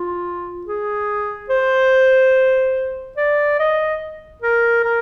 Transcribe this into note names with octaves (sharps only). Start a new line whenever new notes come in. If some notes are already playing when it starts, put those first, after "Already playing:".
Already playing: F4
G#4
C5
D5
D#5
A#4
A#4